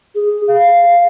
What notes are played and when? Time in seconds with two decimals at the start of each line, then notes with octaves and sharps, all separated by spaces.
0.15 G#4
0.48 F5